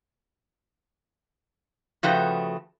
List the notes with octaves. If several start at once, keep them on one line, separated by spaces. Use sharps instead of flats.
C#3 F3 A3 F#4 B4 G5